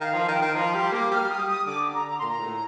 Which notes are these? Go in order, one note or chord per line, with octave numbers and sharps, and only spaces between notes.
D#3 F5
F3
D#3 G5
D#3
F3 A#5
G3 C6
A#3 D6
G3 F6
G3 D#6
G3
D#6
D3 D6
D3 A#5
A#5
A#2 C6
A#5
A2